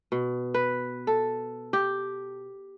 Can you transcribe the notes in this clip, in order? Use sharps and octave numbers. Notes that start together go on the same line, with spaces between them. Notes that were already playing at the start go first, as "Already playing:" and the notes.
B2
B4
A4
G4